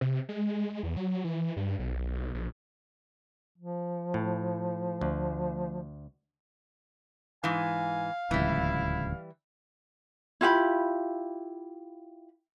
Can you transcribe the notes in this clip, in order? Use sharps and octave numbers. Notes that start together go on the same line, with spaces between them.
C3
G#3
E2
F#3
E3
G2
B1
A#1
F3
A2
D2
G#2 E3 F5 G#5
D1 C#2 E3 G3 E4
E4 F4 G4 B5